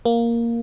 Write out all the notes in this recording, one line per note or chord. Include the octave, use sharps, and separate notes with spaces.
A#3